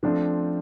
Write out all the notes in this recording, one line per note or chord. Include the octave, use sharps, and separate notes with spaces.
F3 A3 C4 D4